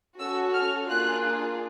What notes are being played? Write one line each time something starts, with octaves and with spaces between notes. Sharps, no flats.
C#4 F#4 A4 E6
F6
A#3 D4 F4 G#4 F#6